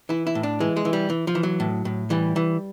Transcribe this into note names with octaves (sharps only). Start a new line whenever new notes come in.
E3 E4
E4
A2
D4
E3 G#3
G#3
E3
G3
E3
F3
E3
F#3
A2
A2
E3 G3
E3